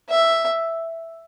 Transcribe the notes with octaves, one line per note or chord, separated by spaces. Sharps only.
E5